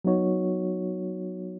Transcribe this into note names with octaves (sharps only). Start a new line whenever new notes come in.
F#3 B3 D#4 F#4 C#5